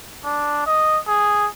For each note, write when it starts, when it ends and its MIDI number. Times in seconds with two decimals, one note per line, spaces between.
0.25 0.62 62
0.66 0.99 75
1.08 1.47 68